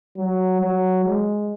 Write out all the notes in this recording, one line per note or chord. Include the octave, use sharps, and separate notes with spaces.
F#3
F#3
G#3